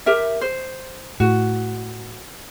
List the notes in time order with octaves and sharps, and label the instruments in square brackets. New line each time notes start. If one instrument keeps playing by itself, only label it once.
[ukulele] G4 A#4 E5
C5
[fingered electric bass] A2 [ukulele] F#4